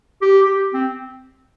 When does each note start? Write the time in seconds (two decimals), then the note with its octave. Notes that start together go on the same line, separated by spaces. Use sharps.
0.22 G4
0.43 G4
0.74 C4